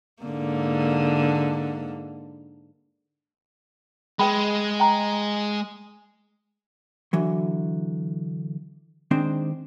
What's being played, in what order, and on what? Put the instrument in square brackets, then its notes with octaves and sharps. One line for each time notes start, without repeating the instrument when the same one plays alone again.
[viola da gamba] G#2 D3 A#3
[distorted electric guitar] G#3 [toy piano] B4 G5 B5
[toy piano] G5 A#5
[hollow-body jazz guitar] D3 E3 F#3
D#3 G#3 C4 D4 C5